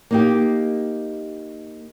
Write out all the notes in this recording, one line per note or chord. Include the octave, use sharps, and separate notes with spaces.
A#3 D#4 G4